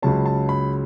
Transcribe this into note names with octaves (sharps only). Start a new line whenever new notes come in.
C#2 C#3 F#3 C#4 A5
A5
B5